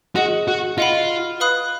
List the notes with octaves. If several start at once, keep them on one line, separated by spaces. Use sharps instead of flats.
F#4 G#4 D#5 F#5
F#4
F4 D#5 F#5 B5
B4 F5 B5 D#6 F#6